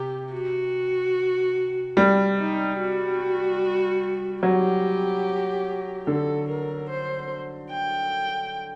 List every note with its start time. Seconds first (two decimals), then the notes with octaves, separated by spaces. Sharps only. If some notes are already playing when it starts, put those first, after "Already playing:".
Already playing: C3 G4
0.33 F#4
1.97 G3
2.37 D#4
2.78 F#4
4.43 F#3 G4
6.07 D3 A4
6.49 A#4
6.89 C5
7.71 G5